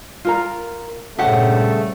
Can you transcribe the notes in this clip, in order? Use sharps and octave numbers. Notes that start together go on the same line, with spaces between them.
F4 A#4 A#5
G2 A#2 C#3 A3 G4 C5 F#5